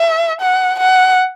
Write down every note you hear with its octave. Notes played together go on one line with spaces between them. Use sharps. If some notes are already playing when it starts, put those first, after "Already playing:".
Already playing: E5
F#5
F#5